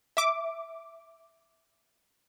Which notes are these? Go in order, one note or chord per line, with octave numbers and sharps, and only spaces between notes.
E5 D6